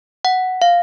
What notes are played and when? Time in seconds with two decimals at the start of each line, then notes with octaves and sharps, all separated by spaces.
0.25 F#5
0.62 F5